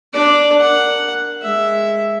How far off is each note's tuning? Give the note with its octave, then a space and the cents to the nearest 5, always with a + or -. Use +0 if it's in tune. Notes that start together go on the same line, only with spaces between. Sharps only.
D4 +0 D5 +0
A#4 +0 F#5 +0
G#3 +0 E5 +0